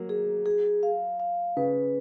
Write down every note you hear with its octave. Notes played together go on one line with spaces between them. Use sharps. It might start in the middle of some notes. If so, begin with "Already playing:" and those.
Already playing: F#3 A#3
G#4
G#4
F5
F5
C#3 B4